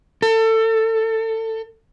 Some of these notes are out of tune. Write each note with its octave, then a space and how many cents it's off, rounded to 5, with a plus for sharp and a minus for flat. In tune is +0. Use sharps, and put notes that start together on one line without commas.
A4 +25